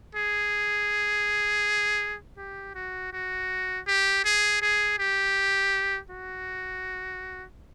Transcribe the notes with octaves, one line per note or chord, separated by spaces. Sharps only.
G#4
G4
F#4
F#4
G4
G#4
G#4
G4
F#4